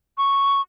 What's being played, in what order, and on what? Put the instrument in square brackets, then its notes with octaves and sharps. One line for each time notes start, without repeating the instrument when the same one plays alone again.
[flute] C#6